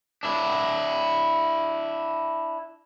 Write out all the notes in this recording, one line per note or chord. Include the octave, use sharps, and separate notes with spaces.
D4 E4